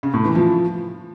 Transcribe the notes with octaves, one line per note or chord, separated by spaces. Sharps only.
C#3
A2
E3
F3